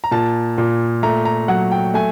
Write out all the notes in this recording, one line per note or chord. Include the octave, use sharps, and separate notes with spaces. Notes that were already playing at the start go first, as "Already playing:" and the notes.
A#5
A#2 A5
A#2
A3 A#5
A#5
F#3 F#5
G5
A3 G#5